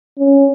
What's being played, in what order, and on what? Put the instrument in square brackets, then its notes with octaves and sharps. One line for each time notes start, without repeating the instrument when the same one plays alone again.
[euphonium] C#4